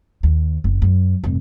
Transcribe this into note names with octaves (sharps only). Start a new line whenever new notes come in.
D#2
F#1
F#2
F1 G2